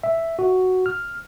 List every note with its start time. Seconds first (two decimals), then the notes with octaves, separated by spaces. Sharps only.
0.03 E5
0.39 F#4
0.86 F6